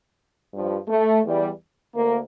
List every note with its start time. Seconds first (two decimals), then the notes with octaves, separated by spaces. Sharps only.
0.53 G2 F3
0.88 A3
1.24 E2 E3 G3
1.95 D2 A#3